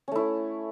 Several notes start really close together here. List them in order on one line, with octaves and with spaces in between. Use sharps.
C#4 A3 E4